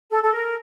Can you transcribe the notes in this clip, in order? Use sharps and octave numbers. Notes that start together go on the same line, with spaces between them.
A4
A4
A#4